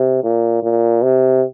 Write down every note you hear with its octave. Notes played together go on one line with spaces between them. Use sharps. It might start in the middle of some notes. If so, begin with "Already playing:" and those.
Already playing: C3
A#2
A#2
C3